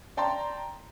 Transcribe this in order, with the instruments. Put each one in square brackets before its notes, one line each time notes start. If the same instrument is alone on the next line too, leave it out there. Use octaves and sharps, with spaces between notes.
[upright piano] D5 G5 A5 A#5 C6